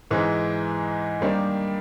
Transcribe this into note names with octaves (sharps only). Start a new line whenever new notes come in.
G#2 E3 G#3
D#3 G3 A#3 D4